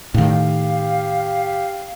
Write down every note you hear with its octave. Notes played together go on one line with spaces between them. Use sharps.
A2 D#3 G4 F5